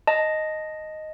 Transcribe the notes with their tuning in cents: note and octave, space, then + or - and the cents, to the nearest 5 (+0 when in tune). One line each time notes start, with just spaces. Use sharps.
D#5 +0 A5 +0